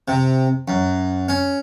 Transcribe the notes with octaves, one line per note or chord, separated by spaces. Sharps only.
C3
F#2
C#4